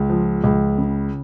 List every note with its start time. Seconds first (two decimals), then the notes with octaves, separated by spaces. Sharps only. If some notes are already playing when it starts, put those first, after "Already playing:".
Already playing: C#2
0.10 F3
0.44 C#2
0.78 C#3